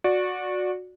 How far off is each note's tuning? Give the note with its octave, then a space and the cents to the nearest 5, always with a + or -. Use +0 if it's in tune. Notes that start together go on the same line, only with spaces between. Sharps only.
F#4 -20 D5 +0